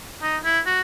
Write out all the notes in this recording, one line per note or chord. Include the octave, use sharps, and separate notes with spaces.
D#4
E4
F#4